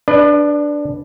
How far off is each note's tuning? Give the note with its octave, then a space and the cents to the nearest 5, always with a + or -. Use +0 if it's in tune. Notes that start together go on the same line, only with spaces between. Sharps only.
D4 +0 B4 +0 D5 +40